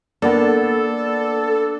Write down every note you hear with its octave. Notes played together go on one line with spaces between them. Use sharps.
A#3 B3 D4 A4